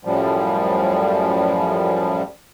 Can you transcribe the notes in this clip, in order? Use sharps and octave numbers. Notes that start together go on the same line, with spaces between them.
F#2 A2 F3 G3